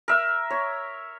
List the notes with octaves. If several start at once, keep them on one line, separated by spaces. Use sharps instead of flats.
A#4 E5
C#5